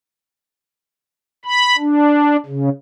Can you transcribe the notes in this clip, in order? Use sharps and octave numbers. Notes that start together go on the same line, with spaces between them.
B5
D4
C#3